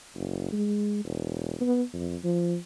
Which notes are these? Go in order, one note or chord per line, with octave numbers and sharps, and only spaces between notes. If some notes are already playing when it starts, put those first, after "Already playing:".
F#1
G#3
E1
B3
F2
F3